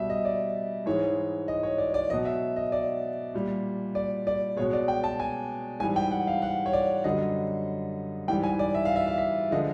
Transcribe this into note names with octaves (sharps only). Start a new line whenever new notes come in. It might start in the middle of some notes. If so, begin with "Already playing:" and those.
Already playing: B2 G3 E5
D#5
D5
G#2 E3 G#3 C#5
D#5
C#5
D5
D5
B2 F#3 D#5
E5
D#5
D5
A#2 G3
D5
D5
B2 G#3 C#5
D5
G5
A5
G#5
G#2 E3 G3 G#5
G5
F#5
F5
F#5
C#5
D5
F#2 D3 G3 D#5
G#2 E3 G3 G5
G#5
D5
E5
F5
E5
F5
E5
D3 F3 G#3 D#5